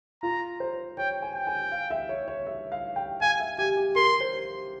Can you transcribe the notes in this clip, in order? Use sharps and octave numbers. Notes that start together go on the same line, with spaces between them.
F4 A#5
C5
C#5 G5
G#5
G5
G#5
F5
E5
C#5
C#5
E5
F5
G5
F5 G#5
E5
G4 G#5
G4
A#4 C6
C5